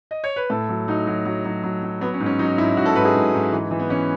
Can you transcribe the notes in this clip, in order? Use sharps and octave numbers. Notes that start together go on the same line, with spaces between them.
D#5
C#5
B4
A2 A4
F#3
F#3 D#4
F#3
F#3
F#3
F#3
F#3
F#3 B3
C#4
G#2
C#4
F#3 D#4
G#2 E4
G#2 F#4
A4
G#2 B4
G#4
G#2
G#2
E3
E3
B3
E3 C#4